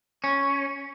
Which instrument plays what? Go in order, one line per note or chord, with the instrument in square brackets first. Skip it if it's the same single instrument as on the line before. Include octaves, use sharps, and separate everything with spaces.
[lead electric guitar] C#4